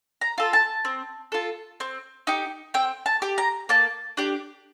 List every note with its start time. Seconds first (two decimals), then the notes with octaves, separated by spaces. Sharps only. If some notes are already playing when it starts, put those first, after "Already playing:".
0.21 A#5
0.38 F4 A4
0.53 A5
0.85 C4
1.32 F4 A4
1.80 C4
2.27 D#4 G4
2.74 C4 G5
3.06 A5
3.22 G4
3.38 A#5
3.69 A#3 A5
4.17 D4 G4